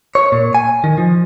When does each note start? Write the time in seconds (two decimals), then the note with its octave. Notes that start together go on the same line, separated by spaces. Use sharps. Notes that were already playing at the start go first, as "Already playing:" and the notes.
0.15 C#5
0.32 A#2
0.55 G#5
0.84 D#3
0.98 F3